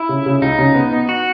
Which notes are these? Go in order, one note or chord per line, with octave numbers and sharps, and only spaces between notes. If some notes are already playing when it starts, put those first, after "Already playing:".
Already playing: E4
C#3
C#3
C#2 D#4
C#3
B3
B3
F#4